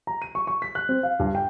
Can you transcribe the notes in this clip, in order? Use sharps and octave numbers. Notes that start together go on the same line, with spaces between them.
A#5
D#7
C#6
C#6
B6
F#6
C4
F5
G2
G5